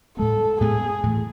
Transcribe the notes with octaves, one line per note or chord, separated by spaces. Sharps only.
A2 G#3 B3 A4
A2 G#3 B3 G#4
A2 E3 A3